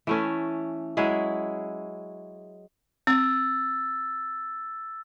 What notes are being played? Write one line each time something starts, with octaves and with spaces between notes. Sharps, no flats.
E3 A3 C#4
F#3 G#3 E4 G#4
C4 E6 A6